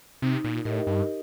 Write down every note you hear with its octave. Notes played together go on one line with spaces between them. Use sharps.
C3 D#4
A#2
A2 G4 A#4 D#5
G2